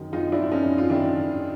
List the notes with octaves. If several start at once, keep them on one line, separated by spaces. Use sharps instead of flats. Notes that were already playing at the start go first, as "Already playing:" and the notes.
Already playing: F#2 D#3
F#2 D#4 F4
D4 E4
F#2
C#4 D#4
F#2
F4
D#3 D4 E4
F#2